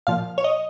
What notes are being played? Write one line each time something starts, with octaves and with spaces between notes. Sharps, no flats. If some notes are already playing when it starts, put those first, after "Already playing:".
A#2 F3 F5
C#5
D#5